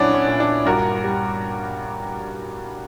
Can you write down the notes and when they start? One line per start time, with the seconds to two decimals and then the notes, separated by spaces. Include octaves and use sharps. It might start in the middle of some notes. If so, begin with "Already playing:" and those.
Already playing: A#2 F#3 B3 C#4 D4 E4 F#4
0.14 C#4
0.27 A#2
0.40 D4
0.65 G2 F#4 A#4
1.04 G3